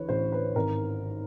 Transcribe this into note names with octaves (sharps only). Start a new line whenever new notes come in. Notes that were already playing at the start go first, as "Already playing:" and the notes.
Already playing: D2 E3 B4 C#5
A1 C5
B4
G#1 A#4
D#3